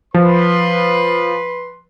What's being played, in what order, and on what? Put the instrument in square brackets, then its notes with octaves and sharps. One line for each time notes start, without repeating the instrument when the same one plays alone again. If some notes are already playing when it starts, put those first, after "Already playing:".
[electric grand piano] F3 [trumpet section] B4 C6